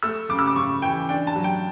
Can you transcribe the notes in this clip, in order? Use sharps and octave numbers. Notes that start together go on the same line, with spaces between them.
A3 E6
C#3 D6
E6
D6
C#3 C#6
E3 G5
D4 G5
A5
F#3
G5